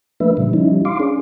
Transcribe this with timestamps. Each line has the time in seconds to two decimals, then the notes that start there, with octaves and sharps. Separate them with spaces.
0.20 F3 A3 A#3 D4 B4 E5
0.37 A#2 C#3 E3 G3
0.53 F3 G3 C#4 D#4 E4
0.85 F5 C6 D6
1.00 C#4 D4 G#4